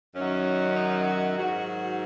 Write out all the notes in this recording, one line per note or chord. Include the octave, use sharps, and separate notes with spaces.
F#2 D#3 F#3 C#4
D#4
F#4
G#2 D#3 F#3 F#4
F#4